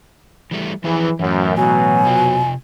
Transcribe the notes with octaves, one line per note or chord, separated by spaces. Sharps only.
E3 G3 A3
E3 F3 E4 G#4
F#2 A2 E3
B2 F#3 G#5
C3 F4